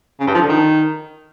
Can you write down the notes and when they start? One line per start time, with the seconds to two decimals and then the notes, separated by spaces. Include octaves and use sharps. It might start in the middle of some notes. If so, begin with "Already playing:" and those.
0.20 C#3
0.27 G2
0.34 F3
0.42 D3
0.49 D#3